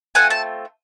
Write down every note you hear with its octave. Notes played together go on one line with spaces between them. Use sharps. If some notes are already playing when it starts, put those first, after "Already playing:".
A3 C4 F4 F#5 G#5
A5